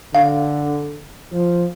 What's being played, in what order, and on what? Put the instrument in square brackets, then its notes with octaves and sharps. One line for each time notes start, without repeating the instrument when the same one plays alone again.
[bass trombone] D3 [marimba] F5
[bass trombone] F3